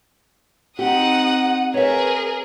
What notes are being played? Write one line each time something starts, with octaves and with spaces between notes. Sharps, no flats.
C4 D#4 G4 F#5 D#6
G#4 A#4 B4 C#5 E5